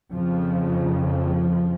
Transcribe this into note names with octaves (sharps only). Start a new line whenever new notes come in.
F2 C#3 F3
F3